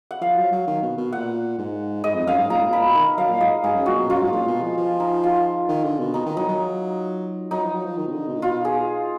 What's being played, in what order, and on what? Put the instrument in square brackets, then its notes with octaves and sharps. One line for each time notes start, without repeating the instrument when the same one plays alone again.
[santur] F#5
[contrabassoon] F3 [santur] F5
[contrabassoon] F#3
F#3
D#3
B2
B2
[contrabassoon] A#2 [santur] F#5
[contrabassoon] G#2
[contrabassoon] G#2 [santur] D#5
[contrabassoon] F2
[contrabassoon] F#2 [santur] F5
[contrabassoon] G#2
[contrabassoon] A#2 [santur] A#5
[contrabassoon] G#2
B2
[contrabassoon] A#2 [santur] B5
[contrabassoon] B2
[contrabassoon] D#3 [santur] A#5
[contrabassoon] F#3 [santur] F5
[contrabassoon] A#2
[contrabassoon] G#2 [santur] D#5
[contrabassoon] G#2 [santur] G#4
[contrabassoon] F#2
[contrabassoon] A#2 [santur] F#4
[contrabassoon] B2
[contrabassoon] F#2 [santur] F4
[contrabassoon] G#2
A#2
B2
F3
F3
[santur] D#4
F4
[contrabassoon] D#3
D3
B2
[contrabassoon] B2 [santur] D#4
[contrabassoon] D#3
[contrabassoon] F#3 [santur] D#4
[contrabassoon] F#3
[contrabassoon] F#3 [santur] D#4
[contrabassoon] F3
F#3
F3
D#3
B2
D3
B2
A#2
[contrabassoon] B2 [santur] F4
[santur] G#4